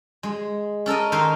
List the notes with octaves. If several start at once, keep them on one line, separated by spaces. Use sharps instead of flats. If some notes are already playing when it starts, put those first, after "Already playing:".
G#3
C#4 A4 A#4 D#5
D#3 D#4 A#4 C5